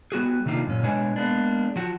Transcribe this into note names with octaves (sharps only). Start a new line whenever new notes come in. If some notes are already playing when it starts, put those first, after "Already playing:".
G3 B3 F#4 G#4
C3 D#3 A3 A#3 D4 F4
F#2 A#2 C#4
B2 G3 G#3 D4 C#5 G#5
G#3 A#3 B3 D4
F3 F#4